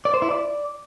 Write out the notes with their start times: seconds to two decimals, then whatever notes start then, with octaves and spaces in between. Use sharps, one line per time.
0.05 D5
0.14 C5
0.22 E4
0.30 D5